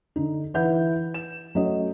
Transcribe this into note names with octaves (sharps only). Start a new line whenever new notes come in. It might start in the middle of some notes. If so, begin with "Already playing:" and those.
D3 D#4
E3 B4 E5 F#5 G6
E7
F#3 A3 C#4 D#5